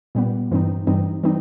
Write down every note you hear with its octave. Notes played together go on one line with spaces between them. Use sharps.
A#2 G3 B3
G2 E3 G3 C4 D#4
G2 E3 G3 C4 D#4
E3 G3 C4 D#4